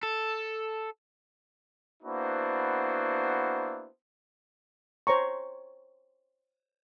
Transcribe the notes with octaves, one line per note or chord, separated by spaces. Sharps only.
A4
A#3 B3 D4 E4 F#4 C5
C5 C#5 A#5 C#6